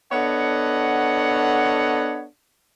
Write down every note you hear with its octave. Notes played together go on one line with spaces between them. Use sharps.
B3 D4 A4 C#5 D#5 F#5